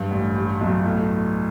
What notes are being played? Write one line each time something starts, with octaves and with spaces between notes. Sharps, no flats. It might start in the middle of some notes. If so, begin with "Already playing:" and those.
Already playing: G2
A1
G3
B1
A2